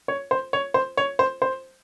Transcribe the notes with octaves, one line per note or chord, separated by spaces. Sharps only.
C#5
C5
C#5
C5
C#5
C5
C5